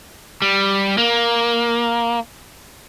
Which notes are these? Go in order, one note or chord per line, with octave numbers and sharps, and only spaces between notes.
G3
A#3